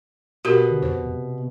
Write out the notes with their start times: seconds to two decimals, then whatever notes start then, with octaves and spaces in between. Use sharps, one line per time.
0.45 B2 F#4 G4 A#4
0.70 D3
0.82 F2 C5
1.06 C3